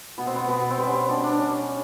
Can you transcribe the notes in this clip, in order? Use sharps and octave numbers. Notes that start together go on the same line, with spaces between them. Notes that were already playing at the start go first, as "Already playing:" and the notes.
B2 B3
C4
B3
B2 B3
C4
G3 B3
C#4
C4
B2 D4
D4
G3 C#4